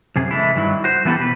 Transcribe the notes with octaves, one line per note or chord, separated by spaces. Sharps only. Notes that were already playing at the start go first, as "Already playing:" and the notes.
F#2 C3 G#4
E3 G#3 A3 E4
G2 D#3 F#3 E4
F#4 C5
E3 A3 B3 E4 G4 A4
B2 B4